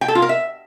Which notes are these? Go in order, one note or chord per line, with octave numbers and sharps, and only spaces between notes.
G5
A4
F4
A#4
E5